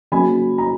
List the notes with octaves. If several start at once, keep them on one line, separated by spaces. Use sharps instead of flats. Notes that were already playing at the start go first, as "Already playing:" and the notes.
C#3 F#3 A#3 G#5 B5
A#5